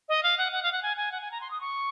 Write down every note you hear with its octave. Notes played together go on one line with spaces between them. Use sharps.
D#5
F5
F#5
F#5
F5
F#5
G#5
G#5
F#5
G#5
A#5
C6
D#6
C#6